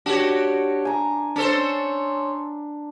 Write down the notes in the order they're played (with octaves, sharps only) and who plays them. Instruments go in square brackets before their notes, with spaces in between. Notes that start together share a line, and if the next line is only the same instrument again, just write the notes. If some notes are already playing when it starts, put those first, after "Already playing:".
[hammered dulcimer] D4 [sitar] F#4 G4 C#5
[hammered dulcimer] G#5 A#5 D6
[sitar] C#4 A4 C5 [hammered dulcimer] D4